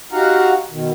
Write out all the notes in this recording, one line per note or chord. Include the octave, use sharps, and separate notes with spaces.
D#4 F#4 G4 F5 F#5 A#5
B2 D#3